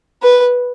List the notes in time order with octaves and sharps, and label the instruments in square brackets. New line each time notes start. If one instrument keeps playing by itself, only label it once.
[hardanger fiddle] B4